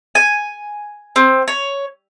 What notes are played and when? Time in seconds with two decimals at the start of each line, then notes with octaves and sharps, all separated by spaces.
0.15 G#5
1.16 C4
1.48 C#5